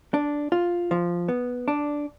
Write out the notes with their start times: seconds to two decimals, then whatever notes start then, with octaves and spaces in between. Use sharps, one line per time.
0.14 D4
0.52 F4
0.91 F3
1.28 B3
1.68 D4